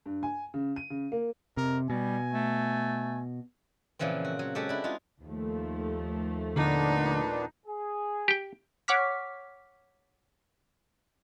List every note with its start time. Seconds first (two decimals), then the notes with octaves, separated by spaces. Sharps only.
0.06 G2
0.23 G#5
0.54 C#3
0.76 D#7
0.90 C#3
1.12 A#3
1.57 F2 C3 A#4
1.90 B2 G3 G#5
2.33 A3
3.99 A#2 C#3 E3 F3 C4
4.25 F#4
4.39 F#3
4.55 G#3 F#4 G4 A4
4.69 D4 E4
4.84 G#3 D#4 F4
5.22 D#2 F3 A3
6.56 A#2 D3 B3 D4 D#4
7.66 G#4
8.28 G4 G5
8.88 C#5 F#5 C#6 D6 F6 B6